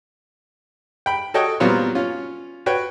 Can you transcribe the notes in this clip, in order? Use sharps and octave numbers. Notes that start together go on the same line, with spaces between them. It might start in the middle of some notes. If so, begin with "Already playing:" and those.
G5 B5
F#4 A4 C#5 D#5 G5
A#2 F#3 G3 B3 C4 F4
C#4 F4
F#4 B4 C#5 G5